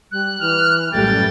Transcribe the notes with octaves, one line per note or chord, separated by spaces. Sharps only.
G3 F#6
E3 F6
A1 F#2 G3 A3 G5 A6